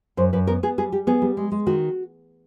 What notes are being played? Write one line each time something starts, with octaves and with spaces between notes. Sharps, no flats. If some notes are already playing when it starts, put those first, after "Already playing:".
F#2 C5
F#2 B4
B3 A#4
B3 G#4
G3 G#4
G3 G4
B3 G#4
G3
G#3
G#3
D#3 F#4